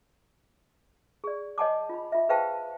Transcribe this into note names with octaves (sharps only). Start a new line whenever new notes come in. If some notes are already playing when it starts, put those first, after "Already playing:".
G#4 D5
C#5 D#5 F#5 G#5 A5 D6
F4 B5
F4 E5
G#4 B4 C5 F5 G5 A5